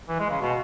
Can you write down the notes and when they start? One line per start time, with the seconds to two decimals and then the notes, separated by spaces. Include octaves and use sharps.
0.08 E3
0.19 G#3
0.30 C#3
0.41 B2